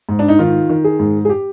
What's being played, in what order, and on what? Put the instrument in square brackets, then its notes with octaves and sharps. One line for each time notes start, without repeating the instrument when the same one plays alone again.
[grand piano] G#2
D4
D#4
D#3 F4
D#3
G#4
G#2
G#4
G4